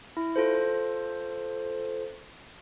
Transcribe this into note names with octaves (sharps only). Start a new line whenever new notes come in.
E4
F4 A4 C5